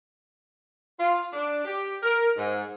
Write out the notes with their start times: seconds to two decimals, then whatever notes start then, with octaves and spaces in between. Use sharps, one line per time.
0.98 F4
1.33 D4
1.65 G4
2.02 A#4
2.36 G#2